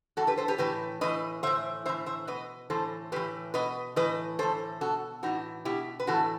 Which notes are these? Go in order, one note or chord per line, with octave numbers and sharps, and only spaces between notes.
A2 E3 F#4 A4
G4 B4
A4 C5
G4 B4
A2 E3 G4 B4
A2 E3 B4 D#5
A2 E3 C5 E5
A2 E3 C5 E5
C5 E5
B2 B4 D#5
A2 E3 A4 C5
A2 E3 G4 B4
B2 B4 D#5
A2 E3 B4 D#5
A2 E3 A4 C5
B2 F#4 A4
A2 E3 D#4 F#4
B2 E4 G4
B4
A2 E3 F#4 A4